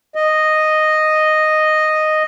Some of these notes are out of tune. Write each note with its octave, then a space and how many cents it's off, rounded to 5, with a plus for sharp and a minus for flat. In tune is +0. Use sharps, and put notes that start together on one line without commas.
D#5 -5